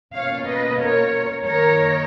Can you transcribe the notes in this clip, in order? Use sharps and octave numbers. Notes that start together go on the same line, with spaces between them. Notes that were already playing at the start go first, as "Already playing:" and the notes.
B2 A#3 C#4 F4 C#5 F5
B4 D#5
A#4 C#5
F#2 D#3 A#3 D#4 A#4 C#5